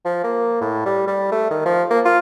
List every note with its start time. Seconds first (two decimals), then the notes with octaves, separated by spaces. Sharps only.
0.05 F3
0.24 A#3
0.61 A2
0.85 G3
1.07 G3
1.31 A3
1.50 D#3
1.65 F3
1.90 A#3
2.05 F4